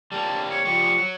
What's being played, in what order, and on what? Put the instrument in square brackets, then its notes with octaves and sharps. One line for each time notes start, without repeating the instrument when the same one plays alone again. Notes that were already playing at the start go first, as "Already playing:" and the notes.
[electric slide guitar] G3 A#3 C4 [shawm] A5
[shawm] C#5
[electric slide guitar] F3 G3 G4 [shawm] C#6
[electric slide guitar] F#3